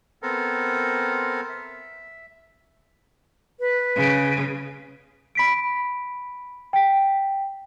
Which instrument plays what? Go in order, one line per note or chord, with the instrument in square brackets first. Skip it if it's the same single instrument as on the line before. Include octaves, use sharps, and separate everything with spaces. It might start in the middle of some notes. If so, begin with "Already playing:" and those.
[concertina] B3 C4 A4 A#4
E5
[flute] B4
[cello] C#3
[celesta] B5 B6 D7
G5 B6